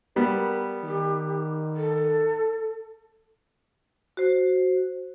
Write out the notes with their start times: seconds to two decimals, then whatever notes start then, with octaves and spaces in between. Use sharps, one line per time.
0.16 G3 B3 A#4
0.85 D#3 G4
1.76 A4
4.17 F#4 C5